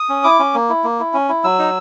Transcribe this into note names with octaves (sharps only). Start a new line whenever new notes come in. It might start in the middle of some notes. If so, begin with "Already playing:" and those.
Already playing: D#6
C#4
E4 D6
C#4
A#3
E4
A#3
E4
C#4
E4
F#3 E6
D#4